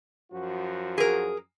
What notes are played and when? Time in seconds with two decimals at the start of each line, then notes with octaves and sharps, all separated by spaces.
0.33 F#2 F3 F#4
0.98 G#4 A#4